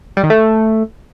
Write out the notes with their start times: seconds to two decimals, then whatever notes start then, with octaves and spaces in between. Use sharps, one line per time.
0.17 G3
0.23 D#3
0.30 A3